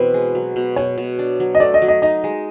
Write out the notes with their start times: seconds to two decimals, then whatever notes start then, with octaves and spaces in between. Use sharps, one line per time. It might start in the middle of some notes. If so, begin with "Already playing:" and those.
Already playing: B2 E3 C4 B4
0.14 G#3
0.35 F#3
0.56 B2
0.76 B2 C#5
0.98 B2
1.19 D4
1.40 F#3
1.55 D#5
1.60 A3 D5
1.74 D#5
1.82 F#3
1.88 D#5
2.02 D#4 D#5
2.24 G#3